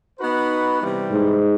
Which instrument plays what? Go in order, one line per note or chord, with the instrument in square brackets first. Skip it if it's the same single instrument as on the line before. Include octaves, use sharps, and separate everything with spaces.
[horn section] B3 D#4 F#4 B4
C3 E3 G3
[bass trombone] G#2